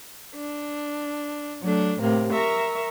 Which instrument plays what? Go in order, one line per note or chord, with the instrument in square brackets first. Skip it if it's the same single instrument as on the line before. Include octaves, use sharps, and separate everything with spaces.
[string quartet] D4
F#3 A3 D4
A2 C3 A#3
A#4 E5 A#5 C#6